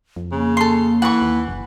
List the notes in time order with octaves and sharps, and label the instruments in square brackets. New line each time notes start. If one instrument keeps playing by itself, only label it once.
[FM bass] F2
[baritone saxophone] C#3 [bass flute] A#3
[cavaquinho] A4 C6
[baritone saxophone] E3 [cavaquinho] F#5 C#6
[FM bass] D#2
F#1